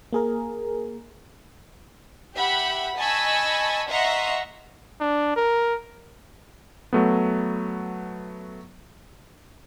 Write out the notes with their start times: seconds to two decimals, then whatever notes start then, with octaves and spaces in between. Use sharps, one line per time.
0.13 A#3 G#4 A#4
2.35 G4 E5 F#5 B5
2.97 D#5 G#5 A5 B5 C#6 E6
3.89 D#5 E5 F#5 A#5 C6 C#6
5.00 D4
5.36 A#4
6.93 F#3 A3 B3